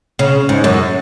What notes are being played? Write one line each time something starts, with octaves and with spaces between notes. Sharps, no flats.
C#3
G#2
F#2